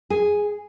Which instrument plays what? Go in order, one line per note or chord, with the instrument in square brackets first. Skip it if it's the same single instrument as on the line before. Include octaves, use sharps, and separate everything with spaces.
[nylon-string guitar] G#4